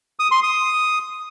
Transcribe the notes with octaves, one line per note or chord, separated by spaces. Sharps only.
D#6
C6
D#6